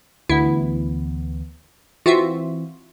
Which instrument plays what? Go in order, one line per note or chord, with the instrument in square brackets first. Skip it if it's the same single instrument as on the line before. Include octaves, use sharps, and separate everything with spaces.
[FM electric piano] D2 E3 B3 [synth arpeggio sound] E4
[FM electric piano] E3 C4 [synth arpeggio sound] F4 F#4 E5